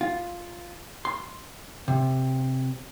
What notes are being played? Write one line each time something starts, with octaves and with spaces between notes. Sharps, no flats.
F4
C6
C3